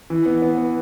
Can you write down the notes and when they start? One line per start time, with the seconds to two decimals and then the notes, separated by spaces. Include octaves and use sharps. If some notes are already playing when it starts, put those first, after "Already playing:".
0.10 E3
0.26 B3
0.42 B3
0.58 B3